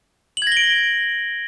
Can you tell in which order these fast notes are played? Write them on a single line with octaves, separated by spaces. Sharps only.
F#7 G#6 A#6 G7 D7